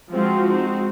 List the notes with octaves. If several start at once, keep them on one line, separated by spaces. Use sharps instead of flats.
F3 G#3 C4 F4 F#4
G#3 C4 D#4